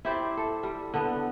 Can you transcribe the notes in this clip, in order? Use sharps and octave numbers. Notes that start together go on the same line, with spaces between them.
E4 G4 C5 D5
A4
G3
D3 B3